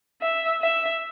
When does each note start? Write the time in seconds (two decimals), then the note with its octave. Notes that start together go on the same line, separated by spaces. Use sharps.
0.22 E5
0.61 E5